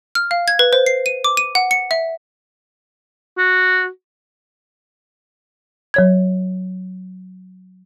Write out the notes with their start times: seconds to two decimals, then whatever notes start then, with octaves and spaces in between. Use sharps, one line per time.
0.15 F6
0.31 F5
0.48 G#6
0.59 B4
0.73 C5
0.86 C7
1.06 D#7
1.24 D6
1.37 D#7
1.55 F#5
1.71 C#7
1.91 E5
3.38 F#4
5.94 F#3 C#5 G#6